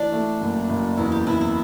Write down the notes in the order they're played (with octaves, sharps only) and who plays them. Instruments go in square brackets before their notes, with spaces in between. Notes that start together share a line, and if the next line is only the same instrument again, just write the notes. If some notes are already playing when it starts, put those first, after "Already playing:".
Already playing: [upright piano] E3 A3 [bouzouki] D4
[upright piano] A3
F#1
F#1
[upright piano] E2 [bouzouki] E4
[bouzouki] G4
[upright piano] E2 [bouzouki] E4
[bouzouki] E4